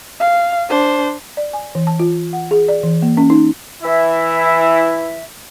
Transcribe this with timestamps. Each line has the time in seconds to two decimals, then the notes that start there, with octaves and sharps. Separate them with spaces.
0.20 F5
0.69 D4 C5
1.37 D5
1.53 G#5
1.75 E3
1.87 A5
1.99 F4
2.33 F#5
2.51 G#4
2.68 D5
2.83 E3
3.02 A#3
3.17 C#4
3.30 D#4
3.82 E3 E4 E5